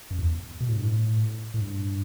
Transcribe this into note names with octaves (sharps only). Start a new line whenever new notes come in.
F#2
E2
B2
A2
G2
A2
A2
G2